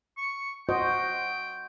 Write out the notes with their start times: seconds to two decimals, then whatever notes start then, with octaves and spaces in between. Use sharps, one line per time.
0.17 C#6
0.69 F#4 C5 D#5 G5